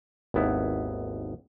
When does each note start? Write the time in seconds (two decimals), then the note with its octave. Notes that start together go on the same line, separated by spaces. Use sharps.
0.34 G#1 D#2 B3 E4